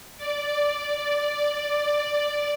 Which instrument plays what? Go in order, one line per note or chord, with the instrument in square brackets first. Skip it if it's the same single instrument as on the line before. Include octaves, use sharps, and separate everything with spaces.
[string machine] D5